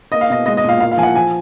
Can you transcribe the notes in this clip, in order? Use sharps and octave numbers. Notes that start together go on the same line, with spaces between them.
A#3 D#5
F5
B2 D#5
G#3 D#5
D#5
A#2 F5
A#3 F5
F5
F3 G#5
F#5
F3 G#5